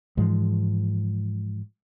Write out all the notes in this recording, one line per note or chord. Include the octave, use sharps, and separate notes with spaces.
G#2 E3 F3 G#3